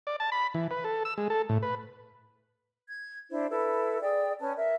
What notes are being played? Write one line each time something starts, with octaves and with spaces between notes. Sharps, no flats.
D5
A5
B5
E3
B4
A4
E6
G#3
A4
A2
B4
G#6
D4 E4 C5
E4 A4 B4
G#4 D5 G5
C#4 B4 C#5 A5
A#4 E5